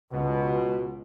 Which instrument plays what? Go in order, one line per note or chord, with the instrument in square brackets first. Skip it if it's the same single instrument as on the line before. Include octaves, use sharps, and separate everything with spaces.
[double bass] C#2 [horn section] B2